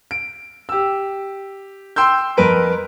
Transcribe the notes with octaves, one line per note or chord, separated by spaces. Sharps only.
D7
G4 E6
G5 C6 E6 G6
F2 A#4 B4 D7